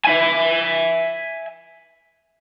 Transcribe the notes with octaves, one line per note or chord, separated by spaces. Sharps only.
E5 G#5